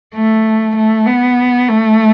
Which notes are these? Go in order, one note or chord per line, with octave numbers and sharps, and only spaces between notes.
A3
A3
B3
A3